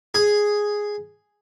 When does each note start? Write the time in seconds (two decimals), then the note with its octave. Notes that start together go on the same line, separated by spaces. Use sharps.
0.15 G#4